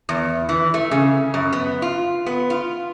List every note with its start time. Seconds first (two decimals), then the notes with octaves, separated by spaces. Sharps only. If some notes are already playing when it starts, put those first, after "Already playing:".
0.09 E2
0.49 E3
0.74 A3
0.91 C#3
1.34 F#2
1.53 B3
1.82 F4
2.26 B3
2.50 F4